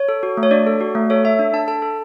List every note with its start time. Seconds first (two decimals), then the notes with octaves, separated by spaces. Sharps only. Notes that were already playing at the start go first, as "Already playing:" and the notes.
Already playing: C#5
0.09 A4
0.23 F#4
0.37 A3
0.43 C#5
0.51 D4 D5
0.67 A4
0.81 F#4
0.95 A3
1.10 A4 C#5
1.24 A4 E5
1.39 D4
1.53 D4 A5
1.68 A4 A5
1.82 A4